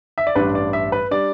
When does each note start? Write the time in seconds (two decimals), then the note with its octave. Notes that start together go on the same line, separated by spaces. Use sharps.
0.18 E5
0.27 D5
0.35 A1 G2 G3 D4 B4
0.55 D5
0.73 E5
0.92 B4
1.11 G3 D4 D5